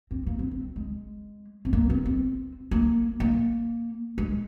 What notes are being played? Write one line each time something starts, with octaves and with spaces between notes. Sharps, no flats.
C4
A#3
C4
C4
G#3
C4
A#3
C4
C4
A#3
A#3
G#3